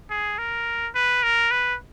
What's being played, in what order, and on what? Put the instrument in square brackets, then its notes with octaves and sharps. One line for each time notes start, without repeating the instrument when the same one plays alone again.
[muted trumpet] G#4
A#4
B4
A#4
B4